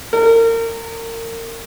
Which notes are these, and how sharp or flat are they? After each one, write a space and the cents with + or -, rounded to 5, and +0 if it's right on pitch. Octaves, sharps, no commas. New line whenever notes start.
A#4 -30